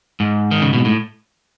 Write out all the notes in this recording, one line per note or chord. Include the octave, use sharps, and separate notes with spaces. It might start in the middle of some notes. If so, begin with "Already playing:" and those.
G#2
D#3
C#3
B2
A2